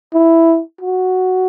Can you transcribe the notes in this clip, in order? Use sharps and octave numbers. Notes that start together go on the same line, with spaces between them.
E4
F#4